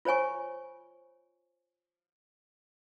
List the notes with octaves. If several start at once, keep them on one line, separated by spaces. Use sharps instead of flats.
F4 C5 C#5 G#5 C#6